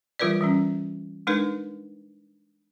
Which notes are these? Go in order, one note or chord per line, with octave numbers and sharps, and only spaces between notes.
E3 G3 F4 A#4 B4 D5
E3 G3 C#4
G#3 D4 D#4 A#4 B4